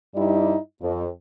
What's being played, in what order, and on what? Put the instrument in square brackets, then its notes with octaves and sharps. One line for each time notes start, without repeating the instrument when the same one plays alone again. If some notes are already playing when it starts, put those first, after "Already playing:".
[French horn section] G2 G3 D#4 E4 D5
F2